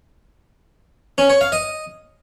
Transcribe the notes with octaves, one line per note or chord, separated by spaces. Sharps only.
C#4
C#5
F5
D#5